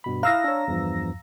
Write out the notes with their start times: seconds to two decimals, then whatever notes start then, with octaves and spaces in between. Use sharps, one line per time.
0.04 G2 B2 B5
0.23 E4 F5 A#5 D#6 E6 F#6 A#6
0.44 D4 C#5
0.68 E2 G2 F3